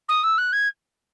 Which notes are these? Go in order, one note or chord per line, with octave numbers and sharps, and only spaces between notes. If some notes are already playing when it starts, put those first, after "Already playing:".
D#6
E6
F#6
G#6